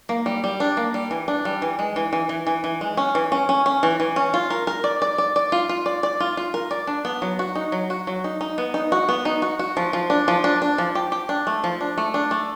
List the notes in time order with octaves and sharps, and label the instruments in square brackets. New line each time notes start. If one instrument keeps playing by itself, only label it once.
[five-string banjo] A#3
G3
G3
D4
A#3
G3
E3
D4
G3
E3
G#3
E3
E3
E3
E3
E3
G#3
C#4
E3
C#4
C#4
C#4
E3
E3
C#4
F4
A#4
A#4
D5
D5
D5
D5
F4
F4
D5
D5
F4
F4
A#4
D5
D4
B3
F#3
F#4
D#4
F#3
F#4
F#3
D#4
D#4
B3
D#4
F#4
B3
D#4
F#4
F#4
F3
F3
D4
F3
D4
D4
F3
G4
G4
D4
A3
F3
D4
A3
D4
A3